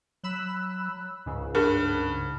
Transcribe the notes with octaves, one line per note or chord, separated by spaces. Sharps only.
F#3 B5 E6 F#6
C#2 G#2 C#3
G2 G#4 A#4